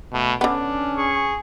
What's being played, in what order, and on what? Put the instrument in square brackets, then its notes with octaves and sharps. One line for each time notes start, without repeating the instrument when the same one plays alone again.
[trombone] B2 [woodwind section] A3
[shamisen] D3 B3 [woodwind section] C#4 [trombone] D4
[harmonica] G#4 C#6